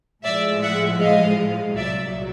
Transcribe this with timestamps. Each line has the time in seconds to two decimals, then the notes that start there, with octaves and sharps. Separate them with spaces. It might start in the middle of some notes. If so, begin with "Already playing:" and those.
0.24 A2 F3 G#3 D5 E5
0.62 E5 F#5
1.00 D#5 F5
1.76 C2 A#2 F#3 D5 E5